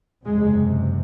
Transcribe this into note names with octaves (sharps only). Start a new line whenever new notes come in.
F#1 E2 C3 G#3